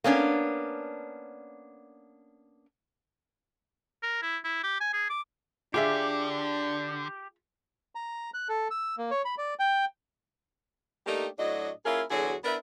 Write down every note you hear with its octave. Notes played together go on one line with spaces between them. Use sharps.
A#3 B3 C#4 D4
A#4
E4
E4
G4
G#5
G#4
D6
D3 D4 F4 G4 G#4 E5
A#5
F#6
A4
E6
A#3
C#5
B5
D5
G5
A3 A#3 D4 D#4 G4
A2 F#3 D4 F#4 D#5
A#3 C#4 E4 F4 G#4 A#4
E2 D3 F#3 F#4 G#4
B3 D4 E4 A#4 B4